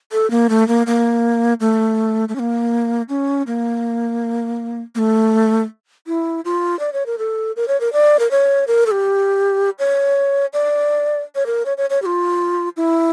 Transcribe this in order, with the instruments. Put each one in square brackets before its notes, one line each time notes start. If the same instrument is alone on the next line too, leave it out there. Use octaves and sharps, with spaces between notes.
[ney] A4
A#3
A3
A#3
A#3
A3
A3
C#4
A#3
C#4
A#3
A#3
A3
E4
F4
D5
C#5
A#4
A4
A#4
C#5
A#4
D5
A#4
C#5
A#4
A4
G4
C#5
D5
C#5
A#4
C#5
C#5
C#5
G4
F4
E4